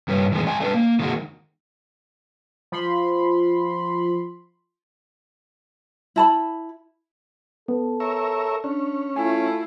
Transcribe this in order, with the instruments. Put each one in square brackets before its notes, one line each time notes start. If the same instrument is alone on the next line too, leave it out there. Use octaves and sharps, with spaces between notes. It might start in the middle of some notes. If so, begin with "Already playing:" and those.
[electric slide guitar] G2 G3 B4 C#5
D#3 E3 G#3 B3
G#3 D#5 G5 G#5
A3 D4 B4
A#3
D#3 G#3 A#3 F#4
[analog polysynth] F3 B5 C6
[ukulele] E4 A5 B5
[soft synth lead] B3 [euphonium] A4
[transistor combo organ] A#4 C#5 E5
[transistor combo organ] C#4 [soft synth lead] D4
[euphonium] A3 [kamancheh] E4 F4 [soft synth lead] G#5